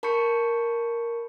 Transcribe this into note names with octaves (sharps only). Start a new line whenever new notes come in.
A#4 A5 B5 C#6 G6 C#7